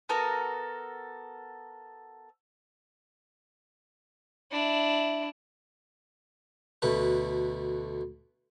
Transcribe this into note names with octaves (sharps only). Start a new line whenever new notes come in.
B3 F#4 A4 A#4
D4 E4
D2 B2 A3 B4